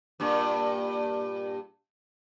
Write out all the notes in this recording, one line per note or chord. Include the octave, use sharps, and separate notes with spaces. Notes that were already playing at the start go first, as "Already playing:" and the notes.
G2 A#2